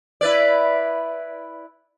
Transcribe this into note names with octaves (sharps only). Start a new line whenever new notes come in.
E4 B4 D5